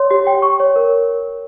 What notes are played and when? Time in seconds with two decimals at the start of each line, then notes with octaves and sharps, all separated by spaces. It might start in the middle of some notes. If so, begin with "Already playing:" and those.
Already playing: C#5 C6
0.11 G4
0.27 G5
0.42 C#6
0.60 C#5
0.76 A#4